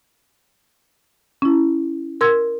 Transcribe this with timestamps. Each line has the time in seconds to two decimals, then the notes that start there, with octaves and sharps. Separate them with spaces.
1.42 C#4 E4
2.21 A#4 C6 E6 G#6